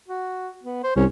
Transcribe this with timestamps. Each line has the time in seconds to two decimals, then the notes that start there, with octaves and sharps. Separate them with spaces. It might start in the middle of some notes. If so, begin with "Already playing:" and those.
0.08 F#4
0.63 B3
0.84 C5
0.96 C2 C#4